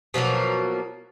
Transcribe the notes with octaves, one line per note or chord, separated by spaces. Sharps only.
B2 F3 F#3 A#3